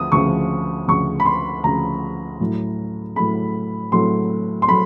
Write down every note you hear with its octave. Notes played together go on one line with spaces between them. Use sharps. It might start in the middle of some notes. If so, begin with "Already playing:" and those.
Already playing: D2 F3 D#6
D2 C#3 F3 C#6
D2 C#3 F3 C#6
B5
C6
D2 C#3 F3 A#5
A2 F#3 A3
A2 F#3 A3 B5
A2 F#3 A3 C6
C6
F#3 A3 B5